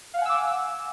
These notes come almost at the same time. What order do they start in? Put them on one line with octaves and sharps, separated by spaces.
F5 F#5 G#5 E6 D6